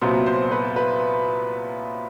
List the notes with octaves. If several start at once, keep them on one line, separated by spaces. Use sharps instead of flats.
C2 A#2 F#3 B3 C5
C5
B4
B4